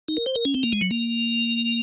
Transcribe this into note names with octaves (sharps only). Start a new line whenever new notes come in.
D#4
A#4
C5
A#4
C#4
C4
A#3
G#3
F#3
A#3